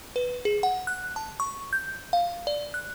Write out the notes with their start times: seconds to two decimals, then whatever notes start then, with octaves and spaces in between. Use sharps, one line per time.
0.16 B4
0.45 G#4
0.63 F#5
0.87 F#6
1.16 A5
1.40 C#6
1.73 G6
2.13 F5
2.47 D5
2.74 F#6